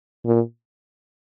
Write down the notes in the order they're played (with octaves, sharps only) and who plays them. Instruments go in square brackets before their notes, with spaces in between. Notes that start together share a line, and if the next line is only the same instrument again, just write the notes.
[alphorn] A#2